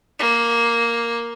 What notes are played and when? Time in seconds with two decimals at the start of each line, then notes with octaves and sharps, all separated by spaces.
0.19 A#3